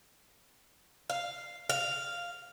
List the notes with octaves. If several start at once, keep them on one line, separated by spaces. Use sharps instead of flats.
F5
F5